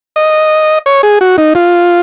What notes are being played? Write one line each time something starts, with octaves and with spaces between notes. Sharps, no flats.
D#5
C#5
G#4
F#4
D#4
F4